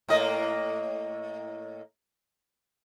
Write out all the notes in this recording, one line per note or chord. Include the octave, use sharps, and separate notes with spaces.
A2 A#3 D#5